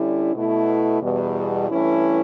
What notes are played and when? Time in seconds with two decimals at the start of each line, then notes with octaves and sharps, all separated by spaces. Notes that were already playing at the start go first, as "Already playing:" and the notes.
Already playing: D3 G3 C#4 E4
0.33 B2 A3 E4
1.01 E2 B2 G3
1.70 G2 E3 A3 C#4 E4